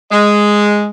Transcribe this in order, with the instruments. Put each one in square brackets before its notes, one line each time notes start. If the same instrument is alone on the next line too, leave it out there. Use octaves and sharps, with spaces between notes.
[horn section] G#3